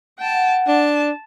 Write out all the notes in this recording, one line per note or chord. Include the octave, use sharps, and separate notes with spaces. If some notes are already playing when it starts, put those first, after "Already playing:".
F#5 G5 A5
D4 A5